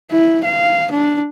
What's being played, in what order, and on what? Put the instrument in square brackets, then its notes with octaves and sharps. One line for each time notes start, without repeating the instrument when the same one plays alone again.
[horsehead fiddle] E4
F5
D4